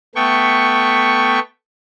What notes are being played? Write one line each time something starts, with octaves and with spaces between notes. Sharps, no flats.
A3 B3 G5 C#6